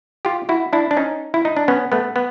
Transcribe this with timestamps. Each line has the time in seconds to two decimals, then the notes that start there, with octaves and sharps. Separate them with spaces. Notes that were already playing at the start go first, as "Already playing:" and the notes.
0.25 F4 G4
0.49 E4 F#4
0.73 D4 E4
0.91 D4
0.97 C#4 D#4
1.34 E4
1.45 D#4
1.57 D4
1.68 B3 C#4
1.92 A3 B3
2.16 B3